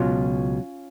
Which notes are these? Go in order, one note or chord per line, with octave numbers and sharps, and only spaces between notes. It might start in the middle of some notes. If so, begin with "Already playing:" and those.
Already playing: C#2 B2 F#3 C#4 F4